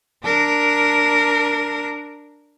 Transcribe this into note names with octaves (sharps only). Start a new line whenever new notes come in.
D4 A#4